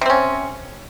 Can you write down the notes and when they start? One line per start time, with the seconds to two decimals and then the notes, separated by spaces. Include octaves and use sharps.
0.01 C3
0.06 C4
0.10 C#4